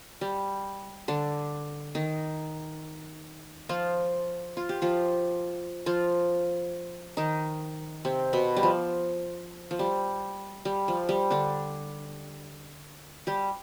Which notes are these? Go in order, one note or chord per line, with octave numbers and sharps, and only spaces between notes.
G3
D3 D4
D#3 D#4
F3 F4
F4
G4
F3 F4
F3 F4
D#3 D#4
C3 C4
B2 B3
G3
F3
F3
G3
G3
F3
G3
D3 D4
G3 G4